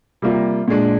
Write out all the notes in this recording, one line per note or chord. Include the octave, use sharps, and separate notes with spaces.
C3 G3 A#3 F4
A#2 G#3 D4